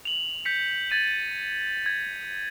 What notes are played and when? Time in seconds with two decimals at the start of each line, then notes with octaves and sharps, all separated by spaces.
0.05 F7 F#7
0.45 G6 B6 C#7
0.90 G#6 A6 D#7 F#7
1.86 G#6